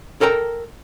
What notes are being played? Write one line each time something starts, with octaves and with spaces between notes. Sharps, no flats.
A4 A#4 G5 A#5